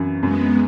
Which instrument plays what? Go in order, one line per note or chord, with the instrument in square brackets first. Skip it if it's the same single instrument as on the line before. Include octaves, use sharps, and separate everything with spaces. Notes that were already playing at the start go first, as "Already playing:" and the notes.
Already playing: [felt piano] F#2 E3
[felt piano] F#2 [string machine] G#3 B3